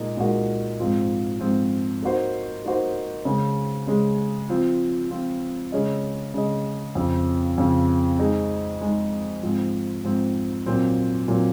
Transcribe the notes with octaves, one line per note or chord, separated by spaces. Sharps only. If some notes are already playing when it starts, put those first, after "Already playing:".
Already playing: A#2 G#3 D#4 A#4
A#2 G#3 D#4 F#4 A#4
G#2 F3 C4 F4
G#2 F3 C4 F4
A#3 D#4 F#4 C5
A#3 D#4 F#4 C5
C#3 G#3 C#4 G#4
C#3 G#3 C#4 G#4
F3 C4 F4
F3 C4 F4
C#3 G#3 C#4 G#4 D#5
C#3 G#3 C#4 G#4 D#5
F2 C#3 F3
F2 C#3 F3
G#3 D#4 G#4
G#3 D#4 G#4
G#2 F3 C4
G#2 F3 C4
A#2 F#3 C4
A#2 F#3 C4